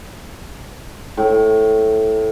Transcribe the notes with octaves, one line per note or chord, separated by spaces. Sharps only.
A2